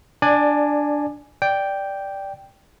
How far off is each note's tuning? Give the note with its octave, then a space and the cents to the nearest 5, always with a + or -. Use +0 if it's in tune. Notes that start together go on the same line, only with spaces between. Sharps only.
D4 +0 D5 +20 G#5 +0
D5 +0 G5 +0